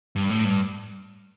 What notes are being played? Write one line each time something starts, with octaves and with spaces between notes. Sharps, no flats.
G2
A2
G2